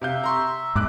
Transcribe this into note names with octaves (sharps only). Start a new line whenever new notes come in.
C3 E5 F5 G6
A#5 C6 C#6
G1 G#2 D6 F#6